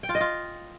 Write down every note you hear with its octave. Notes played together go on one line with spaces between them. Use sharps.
G5
F4
D#5
F4